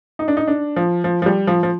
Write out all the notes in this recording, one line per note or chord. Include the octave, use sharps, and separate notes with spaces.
D#4
D4
D#4
D4
F3
F3
F3
G3
F3
F3